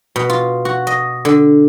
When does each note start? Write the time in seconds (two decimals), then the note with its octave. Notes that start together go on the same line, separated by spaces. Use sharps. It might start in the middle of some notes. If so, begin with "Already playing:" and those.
0.16 B2
0.30 F4
0.65 F#4
0.87 D#5
1.25 D3